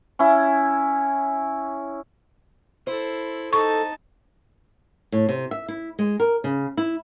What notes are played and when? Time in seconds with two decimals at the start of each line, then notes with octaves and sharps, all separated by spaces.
0.19 C#4 E4
2.87 E4 A4 C5
3.53 D#4 A4 A5 C#6
5.12 A2
5.29 C3
5.51 E5
5.68 E4
5.99 G#3
6.20 A#4
6.44 C#3
6.77 E4